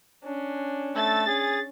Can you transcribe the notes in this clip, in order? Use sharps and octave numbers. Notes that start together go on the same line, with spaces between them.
C#4 D4
A3 E6 A6
C#4 G#4